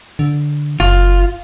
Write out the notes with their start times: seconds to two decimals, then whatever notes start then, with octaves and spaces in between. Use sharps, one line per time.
0.19 D3
0.80 F#1 F4